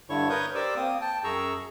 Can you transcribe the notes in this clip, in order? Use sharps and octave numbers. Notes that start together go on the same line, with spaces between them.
G2 D3 E4 C#5 C#6
A#4 B4 C#5 C#6 D#6 G6
G4 A#4 C5 D5 D6 E6
A#3 C4 D#6
G5 A5
F#2 G#4 A#5 C#6 E6